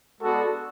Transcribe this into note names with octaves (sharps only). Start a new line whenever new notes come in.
G#3 B3 D4 F#4 A4